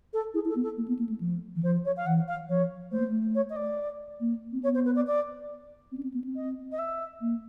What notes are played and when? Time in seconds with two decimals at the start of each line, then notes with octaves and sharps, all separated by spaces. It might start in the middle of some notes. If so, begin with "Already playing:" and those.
0.13 A4
0.34 E4 G#4
0.45 E4
0.49 A4
0.56 B3
0.63 A4
0.77 A#3
0.88 B3
0.99 A#3
1.09 A3
1.20 F3
1.56 E3
1.63 F3 C5
1.85 C#5
1.96 F5
2.06 E3 F#5
2.28 F5
2.49 F3 C#5
2.91 A3 C5
3.00 A#3
3.08 A3
3.35 C#5
3.49 D#5
3.56 D5
4.21 A#3
4.53 C4
4.63 B3 C#5
4.74 C5
4.85 B4
4.95 D5
5.07 D5
5.92 C4
5.98 C#4
6.03 C4
6.14 B3
6.24 C4
6.35 D#5
6.71 D#5
6.78 E5
7.21 A#3